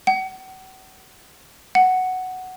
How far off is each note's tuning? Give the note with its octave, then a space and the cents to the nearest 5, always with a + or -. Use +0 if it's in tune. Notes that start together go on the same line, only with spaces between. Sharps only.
F#5 +40
F#5 +5